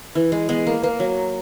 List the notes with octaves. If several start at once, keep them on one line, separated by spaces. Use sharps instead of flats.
E3 B4
G#3
G#3 B3
A#3 A#4
A#3 B4
F#3 C#5